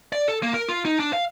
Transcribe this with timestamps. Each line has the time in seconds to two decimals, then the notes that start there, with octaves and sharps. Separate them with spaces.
0.12 D5
0.28 A4
0.43 A#3
0.54 A#4
0.69 F4
0.85 D#4
1.00 D4
1.13 F5